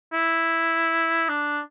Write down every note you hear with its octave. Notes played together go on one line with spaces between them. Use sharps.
E4
D4